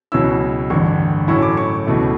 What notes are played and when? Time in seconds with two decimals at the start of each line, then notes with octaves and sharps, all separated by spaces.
0.12 C#2 B2 F#3 C#4 E4 E6
0.70 A1 G2 D3 C#6
1.28 A2 F#3 C#4 E4 C#6
1.42 D6
1.57 C#6
1.86 C#2 B2 A3 E4